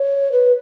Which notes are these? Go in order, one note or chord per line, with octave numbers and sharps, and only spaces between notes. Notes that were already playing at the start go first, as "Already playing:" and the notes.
Already playing: C#5
B4